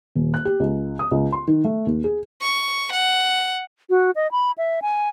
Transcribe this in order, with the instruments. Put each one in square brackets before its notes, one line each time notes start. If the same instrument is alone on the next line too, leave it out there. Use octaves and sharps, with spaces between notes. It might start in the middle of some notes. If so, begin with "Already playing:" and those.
[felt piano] D#1
F#6
G4
C#2
D#6
C#2
C6
D#3
A3
D#2
G#4
[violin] C#6
F#5
[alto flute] F#4
D#5
B5
E5
G#5